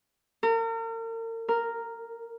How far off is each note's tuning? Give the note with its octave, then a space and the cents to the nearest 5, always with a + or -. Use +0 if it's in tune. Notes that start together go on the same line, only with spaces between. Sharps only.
A#4 -40
A#4 -5